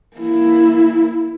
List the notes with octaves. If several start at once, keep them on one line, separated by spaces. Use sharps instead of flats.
A#3 E4